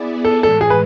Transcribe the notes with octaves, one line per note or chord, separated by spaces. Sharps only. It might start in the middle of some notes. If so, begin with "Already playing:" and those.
Already playing: B3 E4 G#4 D5
A4
A2 E3 G#3 A4
G#4
B4